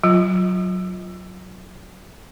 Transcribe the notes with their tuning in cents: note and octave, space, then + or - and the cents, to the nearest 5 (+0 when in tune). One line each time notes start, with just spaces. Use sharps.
F#3 +0 F4 +0